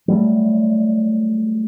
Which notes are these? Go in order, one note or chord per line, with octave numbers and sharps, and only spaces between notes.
F#3 G3 A3